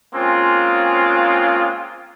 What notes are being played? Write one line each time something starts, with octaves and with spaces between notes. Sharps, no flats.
G#3 A#3 C4 C#4 F4